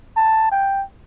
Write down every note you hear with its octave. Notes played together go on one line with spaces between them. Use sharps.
A5
G5